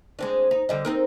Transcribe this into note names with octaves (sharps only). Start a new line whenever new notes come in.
G#3 C4 D4
D#4
D3 G3 D#5
C4 D#4 A#4